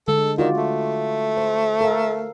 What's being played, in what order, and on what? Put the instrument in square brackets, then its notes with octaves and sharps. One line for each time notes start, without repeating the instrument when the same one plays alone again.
[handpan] D3 G#3 [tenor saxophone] A4
[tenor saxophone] D#3 [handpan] F4 F#4 D5
[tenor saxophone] A3
[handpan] C5
A4 A#4 F5